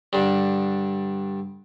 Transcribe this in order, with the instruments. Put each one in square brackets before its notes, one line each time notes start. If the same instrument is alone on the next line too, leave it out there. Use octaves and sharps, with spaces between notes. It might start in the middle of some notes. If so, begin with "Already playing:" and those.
[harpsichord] G2 D3